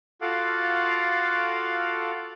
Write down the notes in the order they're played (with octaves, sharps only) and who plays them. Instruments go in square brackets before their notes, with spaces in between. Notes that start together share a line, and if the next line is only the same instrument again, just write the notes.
[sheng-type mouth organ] F4 F#4 A4 F5 F#5 D6